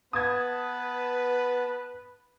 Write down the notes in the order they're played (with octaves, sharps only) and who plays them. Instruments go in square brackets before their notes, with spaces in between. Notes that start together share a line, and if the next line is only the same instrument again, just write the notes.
[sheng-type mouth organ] B3 A5 [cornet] B4 [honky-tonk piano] D#6 G#6